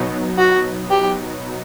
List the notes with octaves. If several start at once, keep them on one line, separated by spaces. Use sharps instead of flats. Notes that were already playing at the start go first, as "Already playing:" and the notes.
Already playing: B2 F#3 B3 D#4
F#4
G4